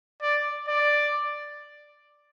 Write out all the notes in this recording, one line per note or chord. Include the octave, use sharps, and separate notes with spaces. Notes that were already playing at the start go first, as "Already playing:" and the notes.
D5
D5